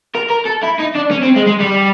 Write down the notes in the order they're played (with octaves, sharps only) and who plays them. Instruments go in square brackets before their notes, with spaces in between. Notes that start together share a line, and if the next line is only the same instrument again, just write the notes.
[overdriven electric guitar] A#4
A#4
A4
E4
D#4
D4
C#4
C4
G#3
G#3
G3